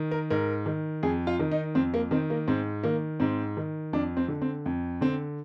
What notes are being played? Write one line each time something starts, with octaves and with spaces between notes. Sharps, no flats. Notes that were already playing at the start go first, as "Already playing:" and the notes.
Already playing: D#3
A#4
G#2 A#4
D#3
F2 G#4
F4
D#3
D#4
F2 C4
A#3
D#3 C4
A#3
G#2 C4
D#3 A#3
G#2 C4
D#3
F2 D4
C4
D3
C4
F2
D3 C4